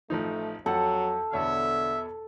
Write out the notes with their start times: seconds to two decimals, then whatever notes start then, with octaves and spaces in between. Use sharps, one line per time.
0.10 A1 F3 A3 D#4
0.66 F2 F#3 A4 F#5 A5
1.33 E2 B2 D3 C#5 E5